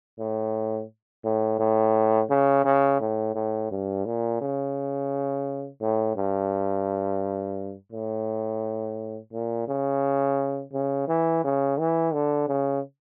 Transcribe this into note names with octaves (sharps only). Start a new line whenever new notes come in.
A2
A2
A2
C#3
C#3
A2
A2
G2
A#2
C#3
A2
G2
A2
A#2
C#3
C#3
E3
C#3
E3
D3
C#3